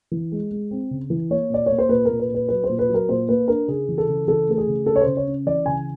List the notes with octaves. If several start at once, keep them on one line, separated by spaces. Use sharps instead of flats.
E3
G#3
G#3
C4
C#3
E3
A#3 C#5
A#2 D5
A#3 C#5
C5
A#2 B4
A#2 A#4
B4
A#2
B4
F#3 B4
C5
A#2
B4
F#3
A#4
A#2 C5
A#3 B4
D4 A#4
C#3 G#4
E3
A4
C#3
E3 A4
A3 A4
G#4
C#3
C#4 A4
C#5
C#3 C5
C#5
C#4
E3 D5
C#3 G#5